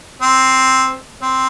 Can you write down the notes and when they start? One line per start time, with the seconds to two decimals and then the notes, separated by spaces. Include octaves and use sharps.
0.22 C4
1.22 C4